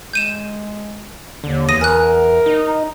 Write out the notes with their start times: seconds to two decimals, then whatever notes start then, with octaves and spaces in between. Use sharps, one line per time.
0.13 G#3 G6 D#7 E7
1.44 D#2 D3
1.69 E2 D#6 A#6 D#7
1.81 A#4 G#5 F#6
2.46 D#4